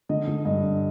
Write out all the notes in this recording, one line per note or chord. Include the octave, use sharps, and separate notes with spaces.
D3 D#5
D3
G2 D#5
G2